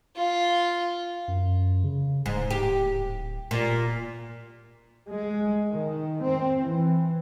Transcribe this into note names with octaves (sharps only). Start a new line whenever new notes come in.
F4
F#2
C#3
D1 G#2
G4
A#2
G#3
D#3
C4
E3